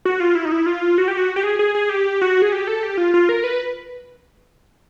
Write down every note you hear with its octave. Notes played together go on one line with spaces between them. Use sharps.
F#4
F4
E4
D#4
E4
F4
F#4
G4
F#4
G4
G#4
G#4
G#4
G4
F#4
G#4
G4
A4
G4
F4
F4
A#4
B4